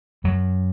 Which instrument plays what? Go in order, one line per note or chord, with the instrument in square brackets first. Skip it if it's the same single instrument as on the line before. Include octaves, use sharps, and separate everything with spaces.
[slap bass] F#2 F#3